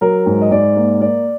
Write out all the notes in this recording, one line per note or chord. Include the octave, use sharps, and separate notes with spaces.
F#3 A#4
G#2
D#5
G#2 D5
A#3
A#3 D5